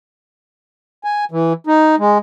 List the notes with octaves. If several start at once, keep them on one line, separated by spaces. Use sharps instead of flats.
G#5
E3
D#4
G#3